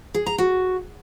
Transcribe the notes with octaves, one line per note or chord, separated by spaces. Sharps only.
G#4
A#5
F#4